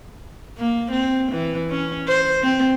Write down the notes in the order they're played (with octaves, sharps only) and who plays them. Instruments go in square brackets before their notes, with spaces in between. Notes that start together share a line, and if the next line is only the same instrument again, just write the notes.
[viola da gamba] A#3
C4
E3
C#4
C5
C4